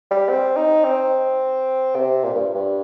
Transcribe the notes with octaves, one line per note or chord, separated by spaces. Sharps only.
G3
C4
D#4
C4
C3
A#2
G2
G2